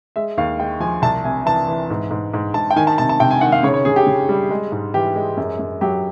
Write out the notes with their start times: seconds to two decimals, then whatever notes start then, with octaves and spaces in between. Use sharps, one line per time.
0.16 G#3 E5
0.37 D#2 F5
0.59 G#3 G5
0.80 F3 G#5
1.02 C2 A5
1.25 C3 G#5
1.45 E3 A5
1.68 E3
1.90 G#2
2.11 G#2
2.34 G#2
2.54 G#2 A5
2.70 G5
2.76 D#3 G#5
2.87 A5
2.98 C3 A5
3.09 A5
3.19 C3 G5
3.31 G#5
3.41 D#3 F#5
3.52 F5
3.63 C#3 C#5
3.74 C#5
3.85 C#3 G#4
3.96 G4
4.06 C#3
4.29 G3
4.51 G#3
4.72 G#2
4.94 E3 G4
5.16 G#3
5.37 F#2
5.59 F#2
5.81 F#3 G4